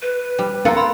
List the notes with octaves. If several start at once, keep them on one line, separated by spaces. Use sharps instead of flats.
B4
G3
A#3 B3 F4 A4 F#5
B5 C6